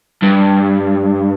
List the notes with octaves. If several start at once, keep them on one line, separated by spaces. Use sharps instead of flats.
G2